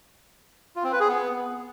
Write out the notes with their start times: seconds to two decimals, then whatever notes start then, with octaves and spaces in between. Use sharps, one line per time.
0.76 F4
0.84 C4
0.92 B4
1.00 G#4
1.08 B3